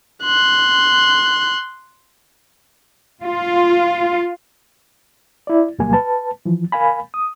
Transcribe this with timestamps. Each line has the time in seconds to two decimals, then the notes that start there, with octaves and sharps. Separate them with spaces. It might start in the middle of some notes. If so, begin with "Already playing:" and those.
0.24 C6 F#6
3.23 F4
5.47 E4 D5
5.79 D2 B2 F#3 G3 A#3 G#5
5.93 B4 A5
6.45 E3 F3
6.72 A#4 F5 G#5 B5
7.14 D#6